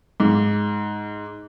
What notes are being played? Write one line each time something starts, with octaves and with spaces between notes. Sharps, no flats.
G#2